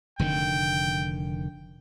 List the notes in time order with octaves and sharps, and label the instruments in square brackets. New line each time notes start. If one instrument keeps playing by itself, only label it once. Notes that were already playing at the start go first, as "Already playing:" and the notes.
[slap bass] F1 D3 D#3 [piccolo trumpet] G5